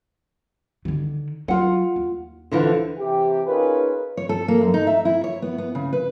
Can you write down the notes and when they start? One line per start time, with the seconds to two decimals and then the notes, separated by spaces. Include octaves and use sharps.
0.85 D3 D#3
1.48 F#3 F4 F#5
1.96 D#2
2.51 D3 E3 F3
2.98 C3 E3 G4
3.46 C#4 D#4 F4 G#4 A#4 B4
4.17 C#5
4.29 A4
4.48 A#3
4.61 F#2
4.74 D#4
4.87 E5
5.05 E4
5.24 C#5
5.42 B3
5.58 B3
5.75 C#3
5.93 B4